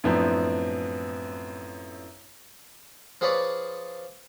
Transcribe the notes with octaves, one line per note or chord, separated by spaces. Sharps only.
F#2 A2 F3 B3 C4 D4
F3 G#4 B4 C#5 D5